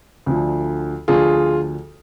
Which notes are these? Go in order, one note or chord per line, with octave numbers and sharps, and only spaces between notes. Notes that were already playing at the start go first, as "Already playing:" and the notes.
D2 D3 F3
D2 D3 F3 F4 G#4